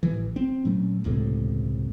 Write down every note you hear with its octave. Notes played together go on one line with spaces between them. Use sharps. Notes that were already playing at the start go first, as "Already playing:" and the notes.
A1 E3
C4
A#2 F#3 A3 C#4
E1 C#2 A2 C3